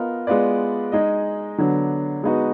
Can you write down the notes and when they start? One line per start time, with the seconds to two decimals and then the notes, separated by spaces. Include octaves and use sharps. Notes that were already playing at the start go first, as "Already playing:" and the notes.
Already playing: B3 F4 A#4 D#5
0.27 G#3 B3 F4 B4 D5
0.92 G#3 D#4 G#4 D#5
1.58 D3 F#3 B3 D4
2.23 G#3 B3 D#4 F#4